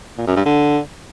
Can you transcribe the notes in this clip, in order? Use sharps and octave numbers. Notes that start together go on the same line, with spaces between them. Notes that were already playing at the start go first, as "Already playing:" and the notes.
A#2
F#2
G2
D3